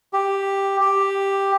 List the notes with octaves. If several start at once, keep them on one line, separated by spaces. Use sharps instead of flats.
G4
G4